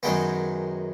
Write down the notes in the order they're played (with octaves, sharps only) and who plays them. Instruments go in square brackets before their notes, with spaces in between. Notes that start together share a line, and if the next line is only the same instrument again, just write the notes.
[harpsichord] F#2 D#3 G#3 B3 G5